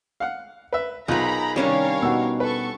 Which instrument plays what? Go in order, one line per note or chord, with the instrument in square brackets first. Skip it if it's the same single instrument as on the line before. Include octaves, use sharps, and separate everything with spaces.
[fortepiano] F5 F#5
B4 E5
[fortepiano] B1 F4 F#6 [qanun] D#4 G#4 [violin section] A#4 A#5 B5
[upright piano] C3 D#3 [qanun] G3 C#4 D4 [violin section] A#4 C#5 F5
[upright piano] B2 D#4 F#5 [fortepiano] E6
[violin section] A4 C#6 [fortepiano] B4